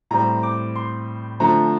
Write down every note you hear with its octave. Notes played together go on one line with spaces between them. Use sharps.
A2 G3 C4 A#5
D6
C6
D3 F3 A3 C4 A#5